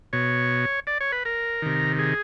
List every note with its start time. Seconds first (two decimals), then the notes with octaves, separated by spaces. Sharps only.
0.13 B2 C#5
0.87 D5
1.00 C#5
1.12 B4
1.25 A#4
1.62 C3 D#3
1.99 G#4